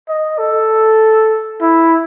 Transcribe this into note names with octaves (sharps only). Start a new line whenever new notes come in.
D#5
A4
E4